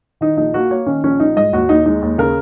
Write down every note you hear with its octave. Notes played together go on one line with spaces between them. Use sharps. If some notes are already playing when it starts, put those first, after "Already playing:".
D#3 D#4
A#1 D#4
A#3 F#4
A#3 C#5
D#3 C#4
A#1 C#4
A#1 D#4
G#2 D#5
D#2 F#4
D#2 D#4
G#3 D#4
D#2
C#3 A#4